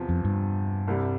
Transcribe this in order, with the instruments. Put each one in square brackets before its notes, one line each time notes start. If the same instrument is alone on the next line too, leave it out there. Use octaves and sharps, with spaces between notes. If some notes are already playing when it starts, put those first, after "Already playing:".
Already playing: [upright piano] E2 C3 F3
[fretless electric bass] F2
G2
[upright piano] C2 C3 G3